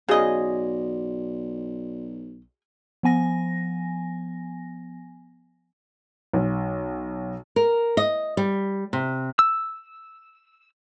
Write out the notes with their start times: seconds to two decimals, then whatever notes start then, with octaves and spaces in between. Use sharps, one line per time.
0.09 B1 C#3 F#4 G#4 D5 D#5
3.03 F3 B3 G#5 A#6
6.33 B1
7.56 A#4
7.97 D#5
8.37 G3
8.93 C3
9.39 E6